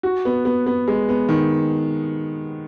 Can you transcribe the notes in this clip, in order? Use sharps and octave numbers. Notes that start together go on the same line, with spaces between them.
F#4
B3
B3
B3
G#3
B3
D#3